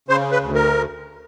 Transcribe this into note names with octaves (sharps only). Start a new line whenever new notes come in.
C#3 C5
B4
D2
A#4